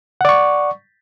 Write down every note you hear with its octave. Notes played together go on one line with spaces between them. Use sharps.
D5 F#5 C#6